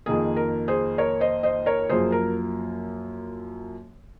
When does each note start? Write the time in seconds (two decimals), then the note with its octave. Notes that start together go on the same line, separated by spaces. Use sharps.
0.06 F2 D#3 A#3 G#4
0.36 A#4
0.68 G#4 C5
0.98 A#4 C#5
1.20 C5 D#5
1.43 C5 D#5
1.66 A#4 C#5
1.89 F#2 F3 A#3 G#4 C5
2.12 A#4